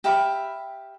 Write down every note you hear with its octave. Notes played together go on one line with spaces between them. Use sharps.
G4 E5 F5 B5